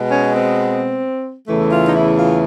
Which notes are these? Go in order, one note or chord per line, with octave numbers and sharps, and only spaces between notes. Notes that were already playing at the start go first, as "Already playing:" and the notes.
Already playing: B2 G#3 B3
C#4
C4
E2 C#3 E3 A3
F4
D#4
E4
F4